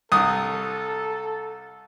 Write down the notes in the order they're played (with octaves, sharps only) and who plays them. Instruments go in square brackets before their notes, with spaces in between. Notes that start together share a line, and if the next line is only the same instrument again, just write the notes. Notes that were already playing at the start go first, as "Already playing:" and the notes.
[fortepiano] C2 D#6 [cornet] A4